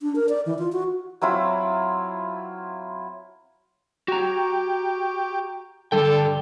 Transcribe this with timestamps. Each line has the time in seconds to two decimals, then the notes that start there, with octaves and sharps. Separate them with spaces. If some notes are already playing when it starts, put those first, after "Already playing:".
0.01 D4
0.16 A#4
0.29 D5
0.46 E3
0.59 F4
0.72 F#4
1.21 F#3 C4 E4 F4
4.08 F#4 G4 A#5
5.92 G2 D3 G3 A4 G5